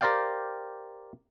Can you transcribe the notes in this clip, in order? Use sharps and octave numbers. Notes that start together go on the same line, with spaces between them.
G4 A#4 C5 D5 F5 G5